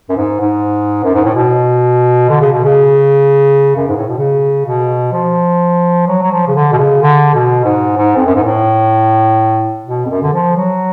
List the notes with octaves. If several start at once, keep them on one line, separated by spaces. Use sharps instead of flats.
F#2
G#2
G#2
F#2
G#2
A2
B2
D3
C#3
B2
C#3
F#2
G#2
A2
B2
C#3
B2
F3
F#3
F#3
F3
C#3
D3
B2
C#3
D3
B2
G#2
G#2
F2
F#2
G#2
A2
B2
F2
F#2
D3
F3
F#3